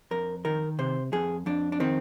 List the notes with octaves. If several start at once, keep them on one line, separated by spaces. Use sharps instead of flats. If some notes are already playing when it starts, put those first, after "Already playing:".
F2 A#4
D#3 A#4
C3 C5
F2 G#4
F2 D4
D4
D#3 C4